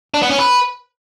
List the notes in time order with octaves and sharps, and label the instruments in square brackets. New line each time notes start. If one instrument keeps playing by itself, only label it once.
[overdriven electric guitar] D4
B3
C#4
B4